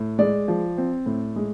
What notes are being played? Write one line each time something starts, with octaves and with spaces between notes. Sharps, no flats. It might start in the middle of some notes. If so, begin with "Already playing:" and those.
Already playing: A2
G#3 D5
F3
C4
A2
G#3